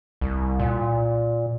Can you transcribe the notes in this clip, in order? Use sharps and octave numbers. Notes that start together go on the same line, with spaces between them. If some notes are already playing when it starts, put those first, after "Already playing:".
C2
A#2